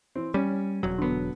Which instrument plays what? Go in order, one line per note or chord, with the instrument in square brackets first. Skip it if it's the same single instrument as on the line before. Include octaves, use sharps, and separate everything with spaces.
[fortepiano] E3 C4
[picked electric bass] G3 [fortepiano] C#4
[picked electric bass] E1 F#3
[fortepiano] D3 B3